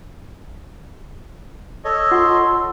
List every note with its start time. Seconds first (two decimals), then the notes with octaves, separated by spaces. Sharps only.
1.85 A4 C#5 D#5 E6
2.11 F4 F#5 C6